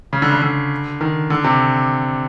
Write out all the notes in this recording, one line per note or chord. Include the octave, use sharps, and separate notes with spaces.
C#3
D3
C#3
D3
D#3
D3
C3